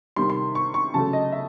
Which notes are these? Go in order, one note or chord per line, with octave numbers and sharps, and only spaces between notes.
C3 D#3 G3 C6
C6
C#6
C#6
C#3 F#3 A3 A5
D#5
E5